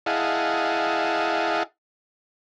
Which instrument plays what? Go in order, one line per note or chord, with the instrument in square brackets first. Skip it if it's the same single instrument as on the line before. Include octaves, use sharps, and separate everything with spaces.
[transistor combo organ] E4 G#4 D#5 F5 F#5 A5